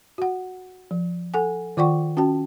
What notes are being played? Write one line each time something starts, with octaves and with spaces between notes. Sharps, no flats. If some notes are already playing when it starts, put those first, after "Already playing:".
F#4 F#5
F3
A4 F#5 G#5
D#3 F4 D5 F#5 G5 C#6
C#4 F#4 G5 A5